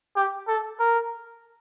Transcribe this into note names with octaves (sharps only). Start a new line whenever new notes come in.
G4
A4
A#4